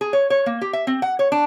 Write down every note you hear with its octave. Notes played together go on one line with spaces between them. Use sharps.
G#4
C#5
C#5
A#3
G4
E5
C4
F#5
C#5
D4